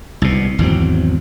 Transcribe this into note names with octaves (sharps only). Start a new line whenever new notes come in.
C2 B2
G#1 E2 F#3 C4